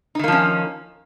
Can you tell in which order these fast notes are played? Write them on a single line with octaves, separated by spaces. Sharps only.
D#4 D#3 A#3 F3 C#4